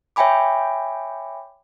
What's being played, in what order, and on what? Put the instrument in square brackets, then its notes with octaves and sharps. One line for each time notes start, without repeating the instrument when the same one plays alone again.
[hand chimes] C#5 E5 G5 G#5 B5 D6